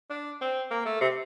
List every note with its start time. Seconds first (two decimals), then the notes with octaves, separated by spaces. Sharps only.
0.10 D4
0.41 C4
0.71 A#3
0.85 A3
1.01 C3